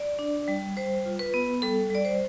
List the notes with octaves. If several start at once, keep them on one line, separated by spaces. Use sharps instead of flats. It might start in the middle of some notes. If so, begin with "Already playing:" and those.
Already playing: D5
D4
G3
G3 C5
F4
B4
B3
G3 A4
G3 D5
C5